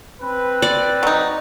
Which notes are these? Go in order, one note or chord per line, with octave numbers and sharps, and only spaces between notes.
C4 B4
D5
F#3 D#4